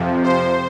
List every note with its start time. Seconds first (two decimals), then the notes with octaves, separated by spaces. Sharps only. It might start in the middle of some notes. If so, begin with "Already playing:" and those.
Already playing: F2 C3 F3
0.23 C5